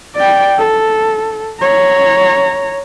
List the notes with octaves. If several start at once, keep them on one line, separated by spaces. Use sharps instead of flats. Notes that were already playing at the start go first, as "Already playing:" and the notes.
D5 G5
A4
C#5 A#5